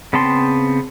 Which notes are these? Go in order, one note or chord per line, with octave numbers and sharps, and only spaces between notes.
C#3 B3 C4 A5 C6